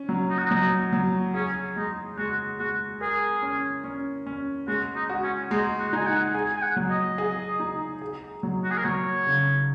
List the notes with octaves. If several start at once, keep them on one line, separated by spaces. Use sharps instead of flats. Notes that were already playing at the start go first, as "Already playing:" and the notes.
Already playing: C#4
F#3
D#4
F#4
D#4
F#3
F#3
C#4 G#4
G#3 D#4
G#3 F#4
G#3 F#4
G#4 A#4
C#4
C#4
C#4
G#3 F#4
D#4
F#4
C#4
G#3 D#4
F#4
D#4 G#5
F#5
G#4 G#5
G#5
F#5
F#3
D#5
G#4
D#4
G#4
F#3
F#4
G#4
A#4
F#3 C#5
C#3